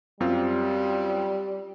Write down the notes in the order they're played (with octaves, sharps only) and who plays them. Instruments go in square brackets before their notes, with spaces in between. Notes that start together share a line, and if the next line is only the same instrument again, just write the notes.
[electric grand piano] F#2 C4 F4 [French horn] G3